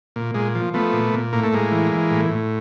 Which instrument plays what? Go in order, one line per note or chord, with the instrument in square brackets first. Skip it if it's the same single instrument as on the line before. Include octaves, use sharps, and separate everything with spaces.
[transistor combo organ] A#2
A#2 G#3
F3
F3 A3 B3
A#2
A#2
A2 A#3
A3
A2 G#3 A#3
E3
E3
A2
A2